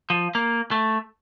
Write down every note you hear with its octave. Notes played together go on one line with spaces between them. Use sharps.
F3
A#3
A3